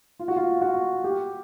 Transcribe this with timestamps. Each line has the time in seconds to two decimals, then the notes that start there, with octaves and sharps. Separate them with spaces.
0.19 F4
0.28 F#4
0.36 F4
0.62 F#4
1.04 G4